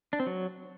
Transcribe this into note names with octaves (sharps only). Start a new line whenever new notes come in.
D4
C4
F#3